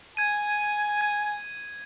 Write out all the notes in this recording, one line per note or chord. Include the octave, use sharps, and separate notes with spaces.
G#5 G#6 D#7
G#6